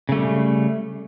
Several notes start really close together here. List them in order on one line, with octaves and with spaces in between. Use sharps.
C#3 A3 G3